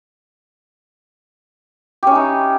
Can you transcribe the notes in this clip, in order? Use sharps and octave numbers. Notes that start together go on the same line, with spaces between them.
C#4 D#4 E4 G4